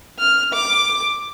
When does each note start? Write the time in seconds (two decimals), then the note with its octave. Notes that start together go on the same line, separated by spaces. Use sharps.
0.19 F6
0.53 D6